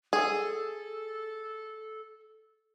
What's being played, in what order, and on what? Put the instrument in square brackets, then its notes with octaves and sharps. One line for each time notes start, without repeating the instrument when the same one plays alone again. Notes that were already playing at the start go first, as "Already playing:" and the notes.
[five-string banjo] G#4 [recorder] A4